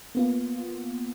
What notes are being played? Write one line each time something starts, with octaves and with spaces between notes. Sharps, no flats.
A#3 B3 F4